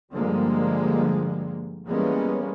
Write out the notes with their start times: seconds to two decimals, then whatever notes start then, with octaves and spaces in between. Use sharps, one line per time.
0.14 G2 D3 F3 G3 G#3 A#3
1.88 E3 G3 G#3 A#3 B3 C#4